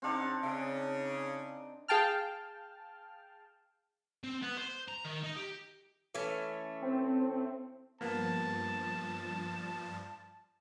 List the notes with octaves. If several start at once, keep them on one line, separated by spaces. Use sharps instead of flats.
C#3 C4 D4 D#4 F5 F#5
C#3
G#4 F5 G5 A5 F6
C4
B3
C5
A#5
D#3
D#4
G4
E3 A3 C#4
C4
G2 F3 A#3 B3 A5